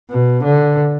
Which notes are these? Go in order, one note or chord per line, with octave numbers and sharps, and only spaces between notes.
B2
D3